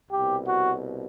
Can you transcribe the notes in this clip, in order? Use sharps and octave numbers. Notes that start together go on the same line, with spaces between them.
C2 B2 G4
F#4